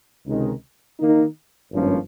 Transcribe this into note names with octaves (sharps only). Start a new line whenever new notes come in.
C#2 C3 D#3 G#3 D#4
D#3 A#3 D#4
G#1 G2 F3 A#3 C#4